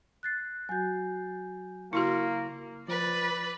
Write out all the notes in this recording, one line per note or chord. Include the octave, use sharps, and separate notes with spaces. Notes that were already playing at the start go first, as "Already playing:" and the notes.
F#6 A6 C7
F#3 F#4 G#5 G6
C#3 A#3 E4 F#4 C6
F3 B4 D5